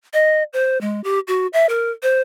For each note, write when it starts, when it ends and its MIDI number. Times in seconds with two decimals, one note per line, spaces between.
0.13 0.43 75
0.53 0.80 72
0.81 1.01 56
1.04 1.19 67
1.27 1.47 66
1.53 1.66 76
1.69 1.91 70
2.03 2.21 72